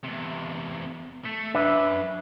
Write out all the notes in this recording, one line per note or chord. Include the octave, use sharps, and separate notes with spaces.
E2 C3
A3
F#2 D4 B4 E5